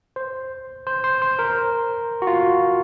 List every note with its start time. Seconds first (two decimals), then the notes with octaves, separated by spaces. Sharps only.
0.16 C5
0.87 C5
1.04 C5
1.22 C5
1.39 A#4
2.22 F#4
2.27 F4